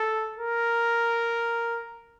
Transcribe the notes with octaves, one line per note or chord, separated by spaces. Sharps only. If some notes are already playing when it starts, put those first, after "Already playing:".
Already playing: A4
A#4